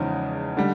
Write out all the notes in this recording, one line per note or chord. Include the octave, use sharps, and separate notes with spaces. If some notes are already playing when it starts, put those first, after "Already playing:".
Already playing: E2 C#3 F3 G#3 D#4
D3 G3